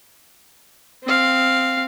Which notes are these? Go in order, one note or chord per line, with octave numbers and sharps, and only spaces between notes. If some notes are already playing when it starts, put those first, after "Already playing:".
C4 F5